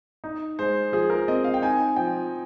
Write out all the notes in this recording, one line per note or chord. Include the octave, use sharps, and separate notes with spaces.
D#4
G#3 C5
F3 G#4
A#4
C4 D#5
F5
G5
D#4 G#5
F3 G5